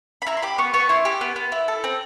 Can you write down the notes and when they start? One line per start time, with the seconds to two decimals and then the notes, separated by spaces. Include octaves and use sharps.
0.22 B5
0.27 E4 A#5
0.37 C6
0.42 G4 B5
0.58 B3 C#6
0.74 B3 C#6
0.89 E4 C6
1.05 G4
1.21 B3
1.36 B3
1.52 E4
1.68 A4
1.84 C4